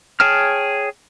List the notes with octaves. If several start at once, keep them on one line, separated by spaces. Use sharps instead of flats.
G#4 C#5 G5 A5 F6